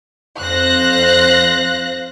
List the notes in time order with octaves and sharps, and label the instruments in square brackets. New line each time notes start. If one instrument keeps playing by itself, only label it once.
[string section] F2 C5 F5 F#6 A#6